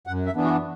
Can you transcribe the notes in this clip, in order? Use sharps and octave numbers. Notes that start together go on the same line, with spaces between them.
F#2 F#5
E5
E3 B3 D4
F#4